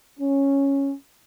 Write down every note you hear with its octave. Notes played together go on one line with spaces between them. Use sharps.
C#4